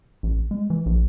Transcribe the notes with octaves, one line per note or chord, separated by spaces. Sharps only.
A1
G#3
E3
A#1